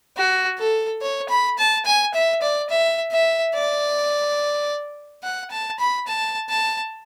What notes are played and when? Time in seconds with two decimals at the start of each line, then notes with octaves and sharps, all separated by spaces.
0.17 F#4
0.59 A4
1.02 C#5
1.29 B5
1.58 A5
1.85 G#5
2.14 E5
2.42 D5
2.70 E5
3.12 E5
3.55 D5
5.24 F#5
5.51 A5
5.79 B5
6.07 A5
6.50 A5